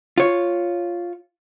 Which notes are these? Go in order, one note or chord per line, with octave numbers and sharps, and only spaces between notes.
F4 C#5